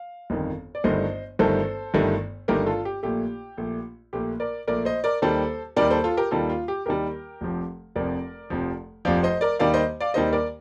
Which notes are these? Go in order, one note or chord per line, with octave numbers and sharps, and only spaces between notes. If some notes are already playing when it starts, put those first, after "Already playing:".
Already playing: F5
G1 F2 D#3
D5
G1 G2 D#3 A3 C5 D#5
G1 G2 D#3 A3 A4 C5
G1 G2 D#3 A3
G1 G2 D#3 A3 G4 A#4
F4 A4
G4
A#1 A#2 A3 G4
A#1 A#2 A3
A#1 A#2 A3 G4
A#4 D5
A#1 A#2 A3 A#4 D5
C5 D#5
A#4 D5
D#2 D#3 G3 A4 C5
D#2 D#3 G3 A#4 D5
A4 C5
F4 A4
G4 A#4
D#2 D#3 G3 F4 A4
F4
G4
D#2 D#3 G3 G4 A#4
F1 F2 C3 F3
F1 F2 C3 F3 A#4 D5
F1 F2 C3 F3
F1 F2 C3 F3 D5 F5
C5 D#5
A#4 D5
D#2 D#3 G3 D5 F5
C5 D#5
D5 F5
D#2 D#3 G3 C5 D#5
A#4 D5